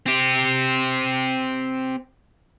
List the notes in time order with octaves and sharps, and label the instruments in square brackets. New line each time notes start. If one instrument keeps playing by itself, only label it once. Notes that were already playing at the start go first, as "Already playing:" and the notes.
[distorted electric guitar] C4 G4